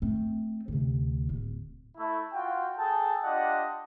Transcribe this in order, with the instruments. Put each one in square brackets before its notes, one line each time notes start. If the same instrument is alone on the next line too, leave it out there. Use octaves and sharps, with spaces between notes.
[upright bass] A3 C4
D2 C3
D1
[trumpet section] A3 E4
F4 F#4 G5
G#4 A4 G5 A5
D4 F4 G4 D#5 F#5